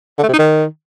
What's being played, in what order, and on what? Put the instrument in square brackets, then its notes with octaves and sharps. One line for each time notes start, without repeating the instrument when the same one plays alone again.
[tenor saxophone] D3
A3
C3
D#4
D#3